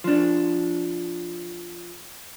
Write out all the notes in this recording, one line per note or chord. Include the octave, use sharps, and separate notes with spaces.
F3 D4